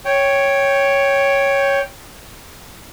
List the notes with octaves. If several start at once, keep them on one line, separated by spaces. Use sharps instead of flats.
C#5 G5